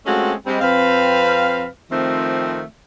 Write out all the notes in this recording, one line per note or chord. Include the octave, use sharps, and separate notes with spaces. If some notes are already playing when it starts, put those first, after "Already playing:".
G#3 A3 C4 C#4 F4 F#4
G3 G#3 C4
F2 C4 B4 F5
D#3 F3 A3 C4